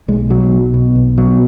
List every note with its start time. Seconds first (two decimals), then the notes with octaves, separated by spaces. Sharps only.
0.08 B1 G#3
0.30 B2 F#3
0.52 B1
0.74 B2
0.96 B1
1.18 B2 F#3